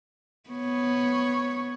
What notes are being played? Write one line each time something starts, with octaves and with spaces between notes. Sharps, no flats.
B3 C#5